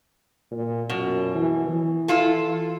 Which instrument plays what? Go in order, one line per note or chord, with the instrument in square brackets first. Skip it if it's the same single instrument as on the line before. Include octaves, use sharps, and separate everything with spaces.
[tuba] A#2
[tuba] F#2 [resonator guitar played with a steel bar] B2
[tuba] E3
E3
[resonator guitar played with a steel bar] E4 F4 A4